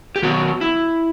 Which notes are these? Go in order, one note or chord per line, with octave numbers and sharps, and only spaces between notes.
G4
D#3 F#3 B3 F#4
E4